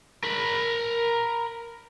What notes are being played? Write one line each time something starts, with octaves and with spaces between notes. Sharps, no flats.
A#4 B5